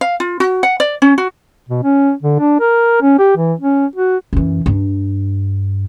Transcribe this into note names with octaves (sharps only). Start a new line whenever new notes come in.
F5
F4
F#4
F#5
D5
C#4
F#4
B2
C#4
D3
D4
A#4
C#4
G4
E3
C#4
F#4
F#2 E3
G2 D4